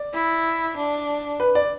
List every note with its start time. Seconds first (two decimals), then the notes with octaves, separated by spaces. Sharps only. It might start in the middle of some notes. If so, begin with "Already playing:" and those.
Already playing: D5
0.14 E4
0.77 D4
1.40 B4
1.55 D5